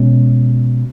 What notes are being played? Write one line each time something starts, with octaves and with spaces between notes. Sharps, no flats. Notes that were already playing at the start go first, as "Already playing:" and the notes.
Already playing: B2 G#3 C#4